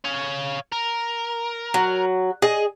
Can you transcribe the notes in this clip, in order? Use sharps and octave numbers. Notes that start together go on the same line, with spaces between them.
C#5 F5
A#4
F#3
G#4 D#5